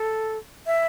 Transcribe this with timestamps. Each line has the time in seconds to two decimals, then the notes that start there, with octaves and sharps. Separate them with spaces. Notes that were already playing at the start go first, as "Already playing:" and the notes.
Already playing: A4
0.67 E5